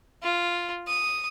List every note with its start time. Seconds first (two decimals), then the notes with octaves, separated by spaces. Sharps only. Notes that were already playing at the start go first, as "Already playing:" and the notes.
0.22 F4
0.87 D#6